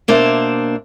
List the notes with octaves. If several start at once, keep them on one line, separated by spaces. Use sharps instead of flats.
B2 A#3 D4 C5 E5